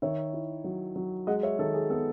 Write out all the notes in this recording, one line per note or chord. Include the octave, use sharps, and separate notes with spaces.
D#3 C#5 E5
E4
F#3
F#3
G#3 D#5 F#5
C#5 E5
D#3 A4
G#4
B3 A4